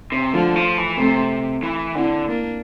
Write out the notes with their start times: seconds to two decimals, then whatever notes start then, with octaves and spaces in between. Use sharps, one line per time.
0.12 C3
0.33 D3 F3 A3
0.56 F3
0.77 E3
0.98 C3 A3 C4
1.63 E3
1.95 D3 C4 E4
2.27 A#3 D4